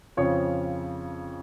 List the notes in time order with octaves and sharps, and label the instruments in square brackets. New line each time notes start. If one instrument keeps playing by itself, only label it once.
[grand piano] F2 C#3 F3 C#5